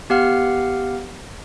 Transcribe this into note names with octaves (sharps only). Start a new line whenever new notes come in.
B3 G4 F5 F#5 F6